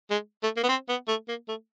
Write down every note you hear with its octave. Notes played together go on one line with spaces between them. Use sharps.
G#3
A3
A#3
B3
C4
B3
A3
A#3
A3